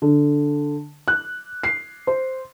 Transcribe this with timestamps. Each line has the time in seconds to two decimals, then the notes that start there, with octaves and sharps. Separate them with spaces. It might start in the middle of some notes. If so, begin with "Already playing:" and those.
0.02 D3
1.08 F#6
1.63 C7
2.07 C5